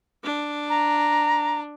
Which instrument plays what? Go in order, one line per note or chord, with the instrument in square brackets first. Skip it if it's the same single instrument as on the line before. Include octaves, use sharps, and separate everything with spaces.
[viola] D4
[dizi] A#5